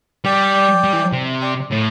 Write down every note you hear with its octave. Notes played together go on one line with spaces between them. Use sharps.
G3 D5 G5
G3
E3
C3
D5 G5
A2